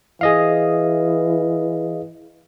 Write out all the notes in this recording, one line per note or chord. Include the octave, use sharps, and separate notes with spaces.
E3 G#4 D#5 F5